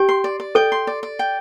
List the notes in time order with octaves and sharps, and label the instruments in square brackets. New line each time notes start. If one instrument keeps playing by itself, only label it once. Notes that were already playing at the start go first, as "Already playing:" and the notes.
Already playing: [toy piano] G4 [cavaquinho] G5
[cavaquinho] C6
D5
D5
[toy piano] A4 [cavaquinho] G5
[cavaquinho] C6
D5
D5
G5